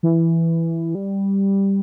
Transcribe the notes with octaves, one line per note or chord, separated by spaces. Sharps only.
E3
G3